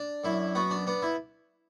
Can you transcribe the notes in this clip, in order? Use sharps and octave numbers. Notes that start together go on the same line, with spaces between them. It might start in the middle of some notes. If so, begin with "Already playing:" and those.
Already playing: D4
F#2 E4
B3 F#4
D4
B3 D4
E4